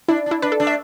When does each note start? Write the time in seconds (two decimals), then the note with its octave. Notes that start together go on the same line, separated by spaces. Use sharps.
0.09 D4 E4
0.26 D4
0.31 E4
0.42 D4 B4
0.52 A4
0.60 A3 D4
0.67 E5